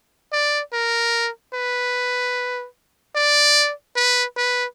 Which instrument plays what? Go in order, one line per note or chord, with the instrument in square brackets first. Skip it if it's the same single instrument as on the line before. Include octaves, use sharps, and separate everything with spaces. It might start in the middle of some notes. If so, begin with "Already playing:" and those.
[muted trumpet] D5
A#4
B4
D5
B4
B4